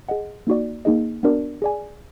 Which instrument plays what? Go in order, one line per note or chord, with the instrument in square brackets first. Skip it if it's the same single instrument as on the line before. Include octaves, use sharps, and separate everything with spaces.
[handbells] G#4 D#5 F#5
A#3 D#4 F#4 D5
A#3 D#4 G#4 D#5
B3 D4 F#4 A#4 D5
G#4 D5 G#5